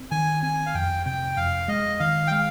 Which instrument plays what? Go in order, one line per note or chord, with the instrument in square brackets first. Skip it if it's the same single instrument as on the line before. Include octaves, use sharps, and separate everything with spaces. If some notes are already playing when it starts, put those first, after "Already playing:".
Already playing: [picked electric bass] C4
[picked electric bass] D#3 [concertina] G#5
[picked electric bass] C4 [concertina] G#5
[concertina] F5
[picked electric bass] F2 [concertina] G5
[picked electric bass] C3 [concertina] G5
[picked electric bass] F2 [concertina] F5
[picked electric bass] G#3 [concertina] D#5
[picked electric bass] D#3 [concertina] F5
[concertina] G5
[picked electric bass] G#3 [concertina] F5